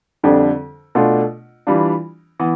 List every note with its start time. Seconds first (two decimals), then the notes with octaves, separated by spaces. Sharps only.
0.23 F2 D3 G3 D4
0.95 B2 A3 D4 F4
1.67 E3 G3 D4 F4
2.39 E3 B3